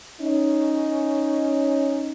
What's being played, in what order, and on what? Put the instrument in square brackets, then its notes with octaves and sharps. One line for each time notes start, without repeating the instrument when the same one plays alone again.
[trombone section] C#4 [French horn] D#4